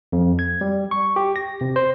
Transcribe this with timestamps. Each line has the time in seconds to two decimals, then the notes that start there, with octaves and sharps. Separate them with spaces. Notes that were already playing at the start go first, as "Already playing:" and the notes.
0.12 F2
0.39 G#6
0.61 G3
0.91 C#6
1.16 G4
1.36 A#6
1.61 C3
1.76 C5